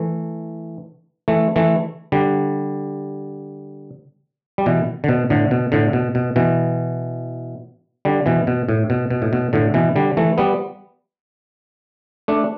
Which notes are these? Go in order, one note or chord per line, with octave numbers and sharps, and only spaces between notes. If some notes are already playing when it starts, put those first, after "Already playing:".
Already playing: E3 A3
E3 A3
E3 A3
D3 G3
G3
B2 E3
D3
B2
A2 D3
B2
A2 D3
B2
B2
B2 E3
D3 G3
B2 E3
B2
A2
B2
B2
A2
B2
A2 D3
B2 E3
D3 G3
E3 A3
G3 B3
A3 D4